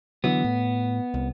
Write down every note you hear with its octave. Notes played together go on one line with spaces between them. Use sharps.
D3 E3 F#3 B3
A2
C2